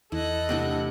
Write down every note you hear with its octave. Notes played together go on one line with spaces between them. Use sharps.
E2 E4 A4 D#5 F#6
D2 C3 C4 E4